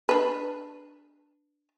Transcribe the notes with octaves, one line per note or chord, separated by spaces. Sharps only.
D4 B4